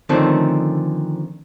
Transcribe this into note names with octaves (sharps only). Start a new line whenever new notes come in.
D3 D#3 F3 A3 C4 C#4